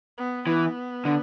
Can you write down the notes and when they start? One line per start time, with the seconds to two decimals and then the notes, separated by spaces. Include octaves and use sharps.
0.18 B3
0.47 E3 B3
1.05 D3